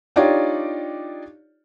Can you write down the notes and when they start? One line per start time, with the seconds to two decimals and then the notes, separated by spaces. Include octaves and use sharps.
0.16 D4 D#4 F4 G4 C#5 D5